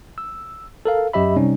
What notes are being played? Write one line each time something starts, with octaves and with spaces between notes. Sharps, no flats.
E6
A4 A#4 F5
F#2 F#3 G4 D#5 E5 B5
C3 G3 C#4 D#4